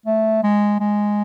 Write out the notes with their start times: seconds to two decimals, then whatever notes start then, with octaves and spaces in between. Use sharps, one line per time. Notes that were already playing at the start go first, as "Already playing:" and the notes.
0.06 A3
0.43 G#3
0.80 G#3